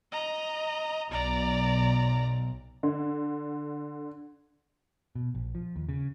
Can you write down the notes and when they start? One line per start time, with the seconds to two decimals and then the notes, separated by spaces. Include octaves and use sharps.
0.12 D#5 A#5
1.11 B1 D5 A#5
2.83 D3
5.15 B2
5.35 A#1
5.55 F3
5.76 D#2
5.89 C#3